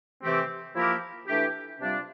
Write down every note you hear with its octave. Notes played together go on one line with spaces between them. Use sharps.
C3 E3 A3 C4 G4
F3 A#3 E4 G4 A#4
E3 A3 D4 G4
C3 G3 D4 F4